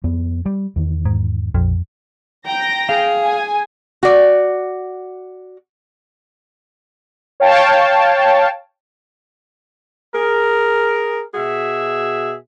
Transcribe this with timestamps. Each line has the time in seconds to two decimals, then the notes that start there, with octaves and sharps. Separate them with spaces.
0.04 F2 B3
0.46 G3
0.76 E2 D#3
1.05 G#2
1.55 A#1 F2
2.46 G5 A#5 A#6
2.89 G#4 F5
3.25 G#5
4.03 F#4 D5
7.40 C#5 F5 G5 A5
10.15 G#4 A#4
11.34 B2 F#4 G#4 E5